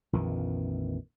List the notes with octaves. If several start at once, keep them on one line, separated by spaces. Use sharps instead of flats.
A#1 F2 D#3 E3